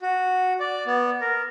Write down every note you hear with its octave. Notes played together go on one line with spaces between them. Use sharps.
F#4
D5
B3
A#4